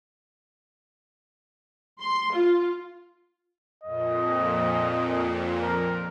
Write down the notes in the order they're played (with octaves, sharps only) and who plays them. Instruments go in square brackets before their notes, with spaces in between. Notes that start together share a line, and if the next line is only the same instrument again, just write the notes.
[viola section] C6
F4
[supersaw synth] F2 A#2 [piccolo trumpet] D#5
[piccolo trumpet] A#4